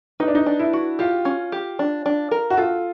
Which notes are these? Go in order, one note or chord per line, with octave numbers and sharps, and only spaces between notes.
D#4 B4
D4
D#4
D4
E4
F#4
F4 G4
C#4
G4
D4
D4
A#4
F#4
F4 A4